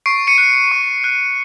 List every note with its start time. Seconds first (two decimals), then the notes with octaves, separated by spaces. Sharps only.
0.06 C#6 C7 D7
0.27 C#7 D#7
0.38 F#6
0.72 C#6
1.04 F#6